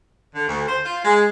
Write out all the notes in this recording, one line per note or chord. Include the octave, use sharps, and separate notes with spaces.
D3
D2
C5
F4
G#3